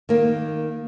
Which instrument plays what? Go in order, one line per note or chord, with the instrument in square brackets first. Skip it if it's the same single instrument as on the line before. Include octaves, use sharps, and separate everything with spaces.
[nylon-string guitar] D#3 A#3